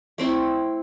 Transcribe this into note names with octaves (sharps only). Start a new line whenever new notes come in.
A3 C4 E4